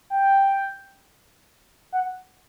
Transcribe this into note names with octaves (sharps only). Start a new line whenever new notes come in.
G5
F#5